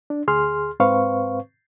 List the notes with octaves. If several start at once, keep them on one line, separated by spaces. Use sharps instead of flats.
D4
D2 G#4 C6 F6
G#2 C4 B4 C5 F5 C#6